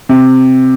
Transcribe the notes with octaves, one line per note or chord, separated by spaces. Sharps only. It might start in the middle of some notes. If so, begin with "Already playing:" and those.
C3